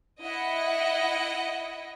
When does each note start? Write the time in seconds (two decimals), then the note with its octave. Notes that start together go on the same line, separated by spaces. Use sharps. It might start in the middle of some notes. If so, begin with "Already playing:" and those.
0.20 E4 D#5 F#5